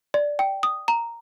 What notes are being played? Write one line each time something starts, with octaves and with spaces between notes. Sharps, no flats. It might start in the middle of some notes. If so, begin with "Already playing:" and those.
D5
G5
D#6
A#5